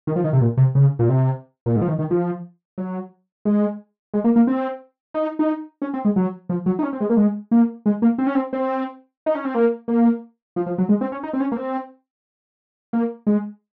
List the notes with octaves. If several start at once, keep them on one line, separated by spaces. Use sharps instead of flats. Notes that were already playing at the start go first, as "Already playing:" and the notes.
D#3
F3
D#3
C3
A#2
C3
C#3
A#2
C3
A#2
G#2
F3
D#3
D#3
F3
F#3
G#3
G#3
A#3
A#3
C4
D#4
D#4
C#4
C4
G#3
F#3
F3
F#3
D#4
C#4
C4
G#3
A#3
G#3
A#3
G#3
A#3
C4
C#4
C4
C4
D#4
C#4
C4
A#3
A#3
F3
F3
F#3
G#3
C4
C#4
D#4
C4
C#4
A#3
C4
A#3
G#3